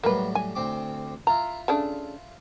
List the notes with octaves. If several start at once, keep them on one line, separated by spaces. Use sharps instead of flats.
A2 F#3 G3 A#3 B4
G#5
D2 C4 D6
E4 F4 A#5
C#3 A3 D4